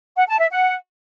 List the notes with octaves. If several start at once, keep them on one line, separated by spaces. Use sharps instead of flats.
F#5
A5
E5
F#5